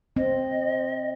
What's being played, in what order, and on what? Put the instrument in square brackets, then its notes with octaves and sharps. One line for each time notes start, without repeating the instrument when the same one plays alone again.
[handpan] C4 [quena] D#5